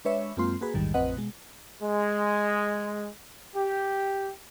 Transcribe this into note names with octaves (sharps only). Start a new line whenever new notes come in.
G#3 D4 B4 C#5 E5
F#2 G#3 A#3 C4 F4 C6
A#3 F#4 G#4 B4
A#1 E2 G#2 D#3 G3
A1 F2 C4 B4 D#5 F#5
B2 G#3
G#3
G4